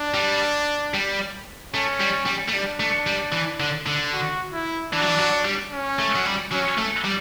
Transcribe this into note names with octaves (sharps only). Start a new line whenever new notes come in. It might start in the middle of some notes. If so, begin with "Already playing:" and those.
Already playing: D4
G3
G3
A3 C#4
G3
G3
A3
G3 D4
A3
G3
E3
D3
D3
F#4
E4
E3 D4
F#3
E3
F#3
G3
C#4
A3
F#3
G3
F#3 C#4
A3
G3